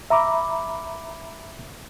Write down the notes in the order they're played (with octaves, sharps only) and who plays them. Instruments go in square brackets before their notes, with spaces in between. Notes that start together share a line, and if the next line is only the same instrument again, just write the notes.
[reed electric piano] E5 A#5 B5 D6